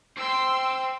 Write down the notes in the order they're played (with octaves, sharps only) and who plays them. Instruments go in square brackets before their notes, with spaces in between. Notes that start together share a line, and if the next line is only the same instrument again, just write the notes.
[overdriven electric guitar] C5 G5 [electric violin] C6 E6